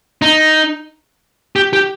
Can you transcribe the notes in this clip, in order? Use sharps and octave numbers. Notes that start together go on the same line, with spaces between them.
D#4
G4
G4